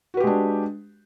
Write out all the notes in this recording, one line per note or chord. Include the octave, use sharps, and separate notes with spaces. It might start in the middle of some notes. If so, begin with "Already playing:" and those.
G#3 D4 F#4 G4 B4